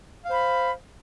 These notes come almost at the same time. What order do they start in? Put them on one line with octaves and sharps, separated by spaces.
F5 C5 B5